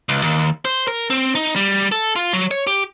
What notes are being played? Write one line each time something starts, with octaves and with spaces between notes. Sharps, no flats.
C#2
D#2
C5
A#4
C4
D#4
G3
A4
F4
F#3
C#5
G4